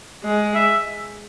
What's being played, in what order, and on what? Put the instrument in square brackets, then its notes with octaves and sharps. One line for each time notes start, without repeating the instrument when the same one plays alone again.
[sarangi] G#3
[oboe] E5